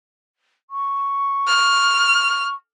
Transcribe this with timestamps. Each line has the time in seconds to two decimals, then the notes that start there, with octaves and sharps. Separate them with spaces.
0.70 C#6
1.47 F6